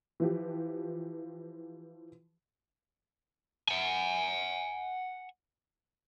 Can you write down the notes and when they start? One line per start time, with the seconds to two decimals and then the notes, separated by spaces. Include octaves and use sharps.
0.20 E3 F3 G4
3.69 F#5 G#5